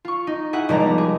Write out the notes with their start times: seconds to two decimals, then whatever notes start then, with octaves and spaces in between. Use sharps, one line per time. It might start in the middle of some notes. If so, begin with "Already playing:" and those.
0.05 F4 C#6
0.27 D#4
0.53 E4 G#4 F#5
0.69 F1 G3 G#3 D5 A#5
0.81 B3
0.98 G#4